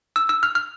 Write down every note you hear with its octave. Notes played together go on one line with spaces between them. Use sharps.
E6
E6
F6
F6